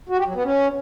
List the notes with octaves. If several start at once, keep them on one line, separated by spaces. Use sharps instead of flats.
F#4
G4
F#3
B3
C#4